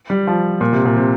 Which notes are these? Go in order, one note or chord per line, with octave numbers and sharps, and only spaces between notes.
G3
F3
A#2
C3
A#2
C3